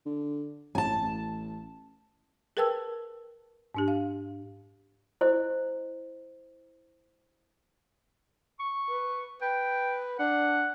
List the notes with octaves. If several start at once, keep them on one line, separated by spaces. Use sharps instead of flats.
D3
A1 G#5 A5
A1
G#4 A#4 B4 G5 A5 E6
G#2 D4 G4
F5
E4 C5 D#5
C#6
B4
B4 G5
D4 F#5